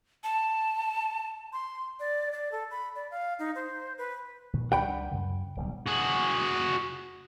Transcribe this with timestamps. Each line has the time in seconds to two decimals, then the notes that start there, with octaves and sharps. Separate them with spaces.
0.24 A5
1.53 C6
2.00 D5
2.32 D5
2.52 A4
2.71 B5
2.95 D5
3.11 F5
3.39 D#4
3.55 C5
3.98 B4
4.53 A#2 D#3
4.72 C#2 G3 D4 F#5 G5 B5
5.11 F#2 C#3
5.56 D1 B1 G3
5.87 F#4 G#4